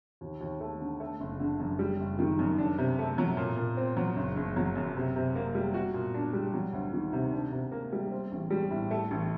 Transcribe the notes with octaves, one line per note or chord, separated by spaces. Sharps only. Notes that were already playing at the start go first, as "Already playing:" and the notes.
D#2
D#2
A3
D3
A3
F#1
D3
F#2
G3
F#1
D#3
F#2
D4
C3
A3
F#3
A#2
A#2
C4
F#3
F#1
F#1
F#3
F#2
C3
C3
A#3
G3
F#4
A#2
D4
G3
F#3
D2
D#3
C3
D4
C3
A#3
G3
C4
A1
G3
A2
A3
A1